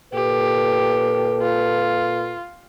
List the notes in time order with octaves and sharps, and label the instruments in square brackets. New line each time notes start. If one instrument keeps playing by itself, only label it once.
[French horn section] A#2 A4 B4 [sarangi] G4
[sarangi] F4